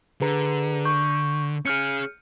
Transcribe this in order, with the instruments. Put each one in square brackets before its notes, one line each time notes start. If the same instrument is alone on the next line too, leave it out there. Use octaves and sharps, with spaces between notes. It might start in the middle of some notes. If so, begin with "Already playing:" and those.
[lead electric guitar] D3 [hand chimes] G#4 B4 A#5
[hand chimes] C#6 G6
[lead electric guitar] C#4 G#4 [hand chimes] F6 G6 C#7